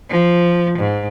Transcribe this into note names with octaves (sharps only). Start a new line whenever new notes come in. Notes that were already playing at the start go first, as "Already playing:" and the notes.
F3
G#2